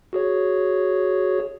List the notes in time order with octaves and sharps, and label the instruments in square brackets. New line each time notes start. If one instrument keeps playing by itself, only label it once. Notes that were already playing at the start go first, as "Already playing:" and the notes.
[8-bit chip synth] F#4 G#4 C#5